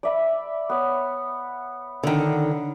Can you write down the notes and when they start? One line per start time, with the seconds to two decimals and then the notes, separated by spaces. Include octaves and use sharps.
0.03 D5 E5 B5
0.69 B3 C#5
2.03 D3 D#3